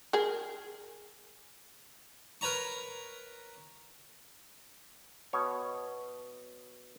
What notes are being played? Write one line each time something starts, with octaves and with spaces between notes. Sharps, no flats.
G#4 A#4
A#4 B4 C#5 A#5 C#6
B2 C#5